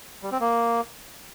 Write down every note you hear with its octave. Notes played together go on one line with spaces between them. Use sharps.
G3
C4
A#3